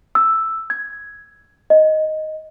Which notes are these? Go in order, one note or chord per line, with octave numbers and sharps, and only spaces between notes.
E6
G#6
D#5